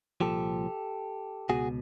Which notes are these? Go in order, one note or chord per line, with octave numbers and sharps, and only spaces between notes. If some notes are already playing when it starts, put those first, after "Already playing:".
C2 A#2 F3 G4 A4
C#2 B2 F#4 G#4